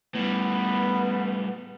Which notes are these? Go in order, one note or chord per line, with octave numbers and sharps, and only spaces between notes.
A2 G3 B3